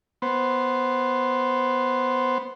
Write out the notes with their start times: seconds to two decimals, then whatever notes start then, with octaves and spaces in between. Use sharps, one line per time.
0.22 B3 C5